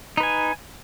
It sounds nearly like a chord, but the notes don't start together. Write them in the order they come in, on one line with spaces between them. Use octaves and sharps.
D#4 B4 G#5